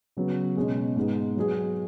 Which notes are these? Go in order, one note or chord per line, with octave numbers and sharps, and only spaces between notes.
C#3 F#3 B3
B2 G#3 C#4 G#4
G#2 G#3 B3 G#4
F#3 B3 G#4